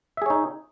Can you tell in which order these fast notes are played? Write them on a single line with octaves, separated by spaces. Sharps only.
E5 G#4 C#5 D#4